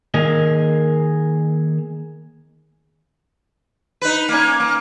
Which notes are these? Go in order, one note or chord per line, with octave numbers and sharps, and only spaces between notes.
D#3 A#3 G#4 D#5
D#4 B4
A#3 C#4
A#3